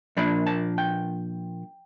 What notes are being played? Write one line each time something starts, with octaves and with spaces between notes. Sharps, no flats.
A#2 F3 A#3 D4 B5
A5
G5